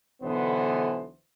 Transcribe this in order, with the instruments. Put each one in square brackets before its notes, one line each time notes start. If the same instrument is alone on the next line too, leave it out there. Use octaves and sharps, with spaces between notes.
[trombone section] B1 D3 E3 B3 C5